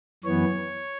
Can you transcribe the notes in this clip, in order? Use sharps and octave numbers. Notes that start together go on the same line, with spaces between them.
F#2 E3 B3 C#5